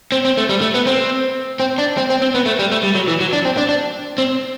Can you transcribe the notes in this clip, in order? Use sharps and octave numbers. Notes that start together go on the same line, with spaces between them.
C4
C4
A3
G3
A3
B3
C4
C4
D4
C4
C4
C4
B3
A3
G3
A3
G3
F#3
E3
F#3
D4
C4
D4
D4
C4